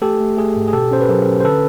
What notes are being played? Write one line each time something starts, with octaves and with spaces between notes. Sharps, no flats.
A3 G4 A4
A3
A3 G#4
G#2
G#4
B2 G4 A4
C#4 C5
B4
F#3 G#4 A#4
C#4
C5
D3 A4 B4